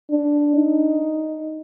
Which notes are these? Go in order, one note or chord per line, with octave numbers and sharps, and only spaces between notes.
D4
D#4